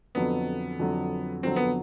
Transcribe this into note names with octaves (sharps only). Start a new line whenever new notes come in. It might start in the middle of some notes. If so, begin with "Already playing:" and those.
F2 D3 F#3 B3
F2 D3 F#3
F2 D3 F#3 C4
B3